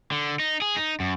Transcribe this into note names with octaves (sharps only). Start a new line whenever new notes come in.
D3
D#4
G#4
D#4
F#2